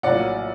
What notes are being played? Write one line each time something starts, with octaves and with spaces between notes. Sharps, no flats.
A#1 A2 F#3 A#3 D5 F#5